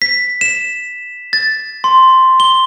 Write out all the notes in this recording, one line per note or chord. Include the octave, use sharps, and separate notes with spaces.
B6
E7
A6
C6
G7